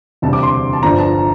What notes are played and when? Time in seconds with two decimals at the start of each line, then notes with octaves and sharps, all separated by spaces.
0.22 E1 D2 C3 G3 A5
0.33 D6
0.43 C6
0.73 A5
0.83 G1 G2 D3 F3 A#5
0.98 A5
1.14 A5